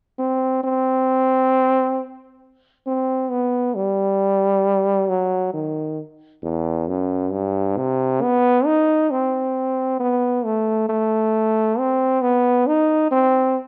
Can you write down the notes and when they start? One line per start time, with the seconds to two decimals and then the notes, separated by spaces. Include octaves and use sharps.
0.18 C4
0.64 C4
2.87 C4
3.30 B3
3.75 G3
5.09 F#3
5.53 D#3
6.43 E2
6.88 F#2
7.32 G2
7.77 C3
8.22 B3
8.65 D#4
9.11 C4
9.99 B3
10.45 A3
10.89 A3
11.78 C4
12.22 B3
12.67 D#4
13.11 C4